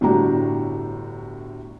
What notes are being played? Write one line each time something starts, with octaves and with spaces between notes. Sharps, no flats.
G1 A2 D4 F#4 G4 A#5